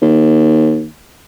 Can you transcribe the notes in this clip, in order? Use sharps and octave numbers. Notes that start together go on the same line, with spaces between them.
D#2